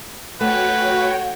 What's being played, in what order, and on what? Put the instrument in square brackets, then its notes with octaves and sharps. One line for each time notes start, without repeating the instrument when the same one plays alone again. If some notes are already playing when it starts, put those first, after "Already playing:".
[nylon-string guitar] A3 [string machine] F#4 C#5 G5 [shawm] B4 [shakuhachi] F#5